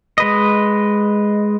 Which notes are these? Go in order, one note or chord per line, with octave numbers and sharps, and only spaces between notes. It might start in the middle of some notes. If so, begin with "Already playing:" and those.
G#3 B4 D#5